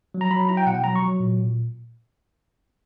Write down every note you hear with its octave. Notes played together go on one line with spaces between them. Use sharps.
F#3
A#5
F#3 B5
E4 A#5
G5
B2 F#5
G5
F#3 A#5
C#6
F#3
A#2
A#2